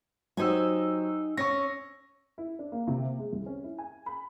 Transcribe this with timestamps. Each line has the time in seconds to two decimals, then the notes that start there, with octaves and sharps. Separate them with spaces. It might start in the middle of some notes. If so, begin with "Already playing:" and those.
0.37 F#3 D#4 G4 C5 G#5 E6
1.37 C#4 C#6 A#6
2.38 E4
2.59 D4
2.72 A#3
2.87 C3
3.04 A#3
3.19 G#3
3.33 C2
3.46 C#4
3.64 E4
3.78 G#5
4.06 B5